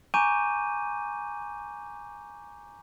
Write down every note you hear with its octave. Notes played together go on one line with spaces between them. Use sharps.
G#5 A#5 C#6 D6 G6 D#7